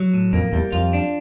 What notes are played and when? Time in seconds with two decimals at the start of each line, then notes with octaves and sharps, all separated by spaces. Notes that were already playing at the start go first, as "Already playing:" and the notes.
Already playing: F#3
0.13 A2
0.33 F2 A#3
0.53 E2 G3
0.72 F2 F4
0.93 D4